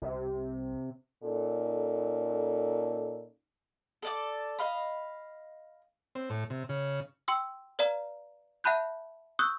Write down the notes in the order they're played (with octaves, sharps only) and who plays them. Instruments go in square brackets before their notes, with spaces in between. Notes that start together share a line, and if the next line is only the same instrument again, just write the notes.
[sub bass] C2 [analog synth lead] C3
[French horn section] A#2 C#4 D#4 A4
[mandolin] A4 D5 D6
D#5 F5 B5
[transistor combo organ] C4
A2
C3
C#3
[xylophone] G5 C6 E6
B4 D5 F5 A#5
E5 F#5 A5 B5 F#6 G6
C#6 D#6 E6 F#6 G6